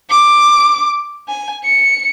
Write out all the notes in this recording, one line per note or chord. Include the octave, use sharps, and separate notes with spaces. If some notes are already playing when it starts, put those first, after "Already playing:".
D6
G#5
C#7